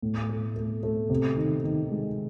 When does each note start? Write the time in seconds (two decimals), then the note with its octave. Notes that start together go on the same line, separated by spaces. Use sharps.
0.02 A2
0.29 A3
0.56 A3
0.83 A3
1.10 C3
1.36 D#3
1.64 D#3
1.91 G#3